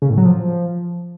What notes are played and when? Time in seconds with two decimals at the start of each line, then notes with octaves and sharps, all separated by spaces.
0.02 C#3
0.10 A2
0.18 F#3
0.25 F3